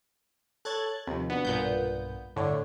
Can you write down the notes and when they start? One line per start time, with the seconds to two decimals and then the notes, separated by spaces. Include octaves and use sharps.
0.65 A4 C#5 A5 F#6 G#6 A6
1.07 D#2 C3 F3
1.30 B3 D4 F#4
1.45 B1 G2 A#2 B3 G6
2.36 G1 A2 D3 C#5 D5